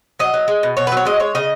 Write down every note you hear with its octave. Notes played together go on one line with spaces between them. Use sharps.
F#3 D#5
F#3
G#3
B2
B2 C#5
B4
F#3
C#5
G#3 D#5
G#3 C#5
C#3 D#5